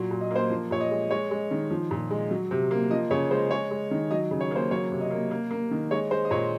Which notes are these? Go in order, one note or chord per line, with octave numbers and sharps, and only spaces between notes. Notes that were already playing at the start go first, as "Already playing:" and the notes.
Already playing: A#2 F#3
A#2
D#5
A#3 C5
F3
A#2 C#5
D#5
G#3
G#3 C#5
G#3
D#3
F3
A#2
G#3
F#3
C3
A#3
F3 D#5
C#3 C#5
G#3 C5
G#3 C#5
G#3
D#3
F#3 D#5
C#3
C#5
A#3 C5
F#3 C#5
C3
D#5
A#3
A#3
A#3
D#3
G#3 C#5
G#3 C5
D#5
A#2 C#5